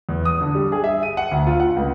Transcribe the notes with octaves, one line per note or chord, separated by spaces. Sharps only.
E2
D#6
D3
G3
G#4
E5
D#7
F#5
D2
F4
F#5
C#2